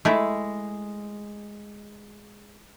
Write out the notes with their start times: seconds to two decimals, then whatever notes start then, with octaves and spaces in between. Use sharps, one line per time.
0.05 G#3 A3 E4